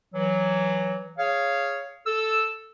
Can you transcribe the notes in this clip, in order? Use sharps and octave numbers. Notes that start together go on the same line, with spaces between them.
E3 F#3
G#4 C#5 F5
A4 E6